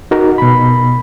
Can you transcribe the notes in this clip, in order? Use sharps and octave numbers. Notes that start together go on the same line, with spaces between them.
D#4 F#4 A#4
B2 B5